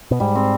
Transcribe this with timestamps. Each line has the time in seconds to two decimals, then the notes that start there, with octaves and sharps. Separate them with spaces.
0.11 B2
0.20 G#2 G3
0.35 C4